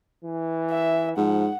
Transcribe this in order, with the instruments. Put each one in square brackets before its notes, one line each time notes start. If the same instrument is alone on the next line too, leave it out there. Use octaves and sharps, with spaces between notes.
[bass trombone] E3
[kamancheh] E5
[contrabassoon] G#2 [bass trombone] F3 [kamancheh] F#5